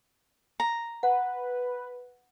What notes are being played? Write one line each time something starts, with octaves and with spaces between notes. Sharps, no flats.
A#5
B4 F#5